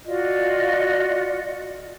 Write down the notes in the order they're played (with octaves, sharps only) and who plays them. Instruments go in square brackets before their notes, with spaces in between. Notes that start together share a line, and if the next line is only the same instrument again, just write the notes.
[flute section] F4 F#4 D5 D#5